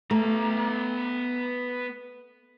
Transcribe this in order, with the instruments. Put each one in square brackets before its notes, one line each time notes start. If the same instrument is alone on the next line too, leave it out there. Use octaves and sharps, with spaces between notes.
[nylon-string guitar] A3 [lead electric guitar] B3 A#5